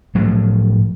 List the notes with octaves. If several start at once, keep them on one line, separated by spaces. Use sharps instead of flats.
A2 F3 F#3